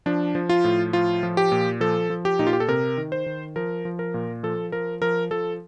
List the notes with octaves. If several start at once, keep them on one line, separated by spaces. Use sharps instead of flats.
F3 D4
F3
F4
A2
F3 F4
F3
G4
A#2
F3 A4
F3
G4
A#2 D#4
F4
G4
A4
C3 A#4
D#3
C5
D#3
F3 A#4
F3
A#4
A#2
F3 A4
F3 A#4
F3 A#4
F3 A4